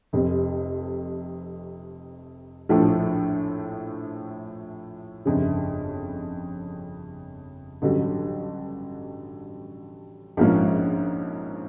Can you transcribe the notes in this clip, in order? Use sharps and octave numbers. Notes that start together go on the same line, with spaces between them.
F1 F2 C3
A#1 A2 F3 A3
G1 F2 C#3
A1 G2 D3 F#3
A#1 G#2 F3 A#3 C#4